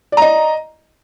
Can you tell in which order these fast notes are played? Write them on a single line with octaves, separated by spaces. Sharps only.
D5 A#5 D#5